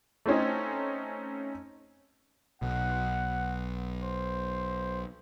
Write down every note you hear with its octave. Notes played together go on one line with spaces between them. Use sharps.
A3 C4 C#4 D#4
B1 F#5
C5